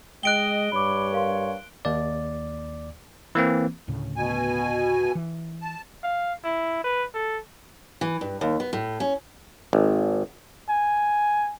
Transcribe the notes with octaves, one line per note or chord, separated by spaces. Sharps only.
G#3 D#5 G5 F#6 D7 G7
G2 C#5 B5 D6
A#4 F5 C6
D#2 D5
E3 A#3 C4
D2 A2 C#3
B2 G#5
E3
A5
F5
E4
B4
A4
E3
G2
D#2
B3
A2
C#4
G#1
G#5